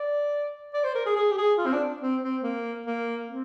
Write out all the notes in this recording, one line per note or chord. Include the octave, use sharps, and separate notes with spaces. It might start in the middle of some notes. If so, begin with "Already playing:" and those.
Already playing: D5
D5
C5
A#4
G#4
G#4
G4
G#4
F4
C4
D4
C4
C4
A#3
A#3
C4